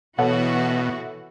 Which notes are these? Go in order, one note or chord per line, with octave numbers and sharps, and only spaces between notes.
B2 E3 F#4 A4 C#5 F#5